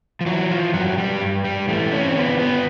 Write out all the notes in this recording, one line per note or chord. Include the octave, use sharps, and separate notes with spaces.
F3
E3 F#3
F3
G2 F#3
G3
G2
G3
E3 A3
C#4
C4
D3 B3
B3